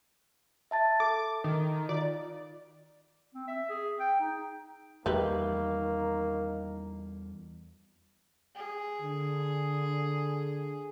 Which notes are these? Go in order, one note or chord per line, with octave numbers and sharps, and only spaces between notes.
E5 A5 A6
A4 D6
D#3
F4 D5
C4
E5
G#4
G5
D#4
E2 D#3 G3 A3 A#3 G4 B4
G#4
D3